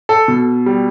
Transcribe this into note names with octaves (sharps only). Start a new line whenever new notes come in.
A4
B2
G3